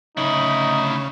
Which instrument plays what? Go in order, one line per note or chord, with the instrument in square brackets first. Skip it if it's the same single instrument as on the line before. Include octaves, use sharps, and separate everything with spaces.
[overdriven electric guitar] D2 E4 [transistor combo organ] C#3 [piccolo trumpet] D#4